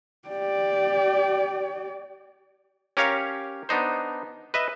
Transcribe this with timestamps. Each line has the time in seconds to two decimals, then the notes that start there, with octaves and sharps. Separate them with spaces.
0.29 G4 D5
2.97 C#4 G4 A#4 C#5 F5
3.69 B3 D4 D#4 C5
4.54 B4 D#5 E5